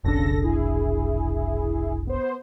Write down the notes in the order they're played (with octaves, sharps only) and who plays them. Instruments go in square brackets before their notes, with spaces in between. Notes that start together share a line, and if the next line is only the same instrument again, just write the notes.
[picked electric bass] F1 B1 D4 [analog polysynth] C#3 A4 A#6
[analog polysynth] E4 G#4
B3 C5